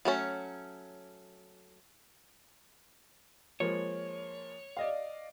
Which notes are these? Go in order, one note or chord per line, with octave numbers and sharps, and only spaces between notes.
F#3 A3 C#4
F3 G#3 A#3 C#5
D5 D#5 F5